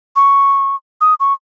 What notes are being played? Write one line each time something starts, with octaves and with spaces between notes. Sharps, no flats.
C#6
D#6
C#6